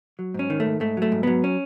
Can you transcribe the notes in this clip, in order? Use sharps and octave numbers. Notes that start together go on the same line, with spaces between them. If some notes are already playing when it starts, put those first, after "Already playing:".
F#3
G#2 C#4
D#3
A3
G#2
G#2 A3
F#3 A3
G#2
F#3 B3
C#4